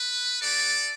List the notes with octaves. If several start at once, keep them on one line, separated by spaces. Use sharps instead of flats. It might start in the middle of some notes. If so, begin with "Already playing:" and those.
Already playing: B4
A3 F#4 A4 D5